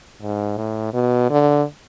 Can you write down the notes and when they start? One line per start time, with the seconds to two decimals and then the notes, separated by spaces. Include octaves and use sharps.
0.21 G#2
0.57 A2
0.94 B2
1.30 D3